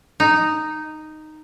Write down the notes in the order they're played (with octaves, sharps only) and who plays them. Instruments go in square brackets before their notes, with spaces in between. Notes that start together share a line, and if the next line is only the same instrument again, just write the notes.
[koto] D#4